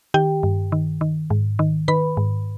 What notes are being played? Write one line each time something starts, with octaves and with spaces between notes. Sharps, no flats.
D#3 G4 G5
G2
D#3
D#3
G#2
D#3
D#3 B4 B5
G#2